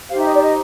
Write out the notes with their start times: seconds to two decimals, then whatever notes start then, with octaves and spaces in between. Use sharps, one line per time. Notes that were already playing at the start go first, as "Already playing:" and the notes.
0.09 D#4 G4 C5 F5
0.18 E5
0.26 D#5
0.34 D5
0.42 D#5